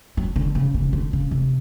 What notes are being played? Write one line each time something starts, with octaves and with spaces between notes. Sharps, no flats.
F#3
D3
C#3
C#3
D3
C#3
C3